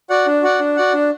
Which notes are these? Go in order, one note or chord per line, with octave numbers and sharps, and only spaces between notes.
F#4 D5 F#5
D4
F#4 D5 F#5
D4
F#4 D5 F#5
D4